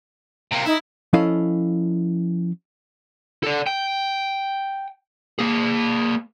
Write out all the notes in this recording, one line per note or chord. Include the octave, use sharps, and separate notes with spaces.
C3 A#3
D#4 E4
F3 C#4 E4 A4 D#5 F5
A4 D5
G5
A#3 G#4